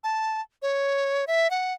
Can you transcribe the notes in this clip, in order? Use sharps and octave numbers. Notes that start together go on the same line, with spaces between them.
A5
C#5
E5
F#5